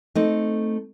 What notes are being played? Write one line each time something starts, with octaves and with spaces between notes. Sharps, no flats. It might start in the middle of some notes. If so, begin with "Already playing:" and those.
A3 C4 D#4